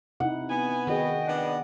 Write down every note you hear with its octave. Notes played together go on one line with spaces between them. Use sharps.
C3 D#4 E4 F#5
B3 G#5
D#3 F#4 G#4 D#5 G5
B3 D4